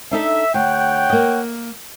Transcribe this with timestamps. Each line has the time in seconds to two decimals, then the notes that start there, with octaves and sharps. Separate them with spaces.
0.11 D4 D#4 A4 E5
0.54 D2 C#5 F#5 G5
1.10 A#3 D#5